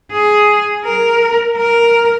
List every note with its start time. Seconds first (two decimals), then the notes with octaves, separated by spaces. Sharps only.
0.11 G#4
0.84 A#4
1.56 A#4